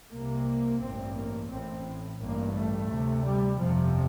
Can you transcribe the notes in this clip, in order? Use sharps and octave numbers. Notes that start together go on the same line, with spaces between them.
C2 C3 A#3
A1 G2 C4
A#3
A1 A2 C4
A1 G2 A#3
A3
D2 C3
G3
G1 F2 C3 F3